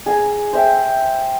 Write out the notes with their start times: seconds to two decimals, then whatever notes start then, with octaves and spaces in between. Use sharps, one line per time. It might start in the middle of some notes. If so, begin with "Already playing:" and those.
0.06 G#4 G#5 A#5
0.53 C5 E5 G5